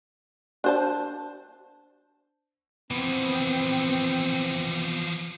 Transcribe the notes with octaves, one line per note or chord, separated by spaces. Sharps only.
D4 C5 A5
E3 F3 B3 C4